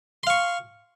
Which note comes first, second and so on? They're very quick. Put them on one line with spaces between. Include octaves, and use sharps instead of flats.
C6 F5 C#6